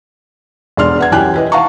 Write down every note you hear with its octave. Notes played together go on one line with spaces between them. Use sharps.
E1 D4 C6 F6
B4 F#5 G#6
F#2 E3 G4 G5 G#5 F#6
E4 B4 D#5
F5 F#5 A5 A#5 C#6